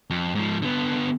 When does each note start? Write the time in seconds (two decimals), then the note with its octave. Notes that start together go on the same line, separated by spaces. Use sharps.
0.10 F2
0.35 G#2 F3
0.62 D3 B3